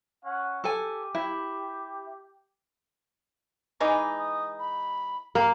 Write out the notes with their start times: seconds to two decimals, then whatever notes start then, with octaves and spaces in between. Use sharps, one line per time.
0.24 C#4 F#5
0.64 G4 A4 G#5
1.15 E4
3.80 E3 G#3 D#4 D6
4.18 D#6
4.59 B5
5.35 A#3 G5